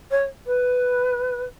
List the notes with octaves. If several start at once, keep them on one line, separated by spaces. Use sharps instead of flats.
C#5
B4